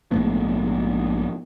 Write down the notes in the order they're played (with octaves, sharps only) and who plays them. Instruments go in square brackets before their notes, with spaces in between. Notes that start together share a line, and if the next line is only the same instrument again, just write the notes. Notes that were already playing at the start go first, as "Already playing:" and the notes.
[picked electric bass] A#1 G#2 A3 B3